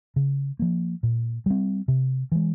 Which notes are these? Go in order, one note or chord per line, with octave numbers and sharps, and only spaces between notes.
C#3
F3 A#3
A#2
G3 C4
C3
E3 G#3